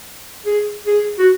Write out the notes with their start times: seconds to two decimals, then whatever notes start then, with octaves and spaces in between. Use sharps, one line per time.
0.46 G#4
0.86 G#4
1.19 F#4